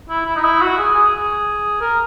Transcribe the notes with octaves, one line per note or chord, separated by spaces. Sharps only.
E4
E4
D#4
E4
F#4
G#4
G#4
A#4